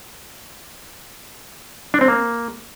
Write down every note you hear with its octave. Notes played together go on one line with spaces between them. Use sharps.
D4
C4
A#3